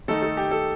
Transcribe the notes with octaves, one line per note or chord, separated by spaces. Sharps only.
D#3 A3 D#4 A4
A4
G4
A4